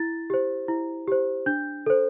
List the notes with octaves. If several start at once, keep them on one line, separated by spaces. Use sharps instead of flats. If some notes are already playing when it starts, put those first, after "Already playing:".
Already playing: E4 A6
G4 C5
E4
G4 C5
D4 G6
A4 C5